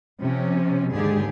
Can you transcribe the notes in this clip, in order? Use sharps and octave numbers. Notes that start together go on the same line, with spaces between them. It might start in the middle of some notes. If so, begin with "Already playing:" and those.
C3 F3 C#4
D#2 G#2 D3 G#3 G4 G#4